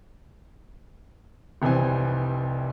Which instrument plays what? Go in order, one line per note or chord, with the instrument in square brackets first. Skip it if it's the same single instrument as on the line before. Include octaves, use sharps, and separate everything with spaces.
[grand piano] F1 C2 E3 C4 G#5